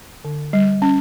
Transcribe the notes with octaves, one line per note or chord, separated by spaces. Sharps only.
D3
G3
C#4